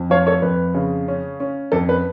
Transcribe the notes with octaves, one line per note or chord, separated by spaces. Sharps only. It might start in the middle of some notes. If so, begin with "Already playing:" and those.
Already playing: F2
F3 C#5 F5
A4 C#5
F2 B4
C#3
C#4
C#4
F2 A4
B4